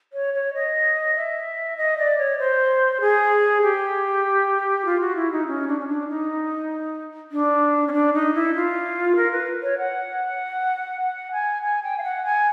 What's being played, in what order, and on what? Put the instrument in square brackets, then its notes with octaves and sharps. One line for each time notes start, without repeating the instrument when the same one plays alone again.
[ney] C#5
C#5
D#5
E5
D#5
D5
C#5
C5
G#4
G4
F4
F#4
E4
D#4
C#4
D4
C#4
D4
D#4
D4
C#4
D4
D#4
E4
F4
A#4
B4
C#5
F#5
F#5
G#5
G#5
G5
F5
F#5
G#5